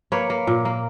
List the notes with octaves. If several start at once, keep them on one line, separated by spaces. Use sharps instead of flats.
A#3 B4 C#5
A#3
A#2
A#3